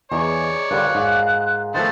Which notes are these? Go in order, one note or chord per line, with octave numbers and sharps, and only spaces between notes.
E2 D#4 G#4 C#5 D5 A5
G2 D3 A#3 F4 F#6
G#2
D#3 F3 A3 B3 C5 A6